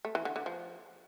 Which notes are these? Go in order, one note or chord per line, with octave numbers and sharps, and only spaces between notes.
A3
E3
D3
D3
F3